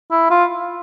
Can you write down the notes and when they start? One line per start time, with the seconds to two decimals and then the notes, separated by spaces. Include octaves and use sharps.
0.11 E4
0.31 F4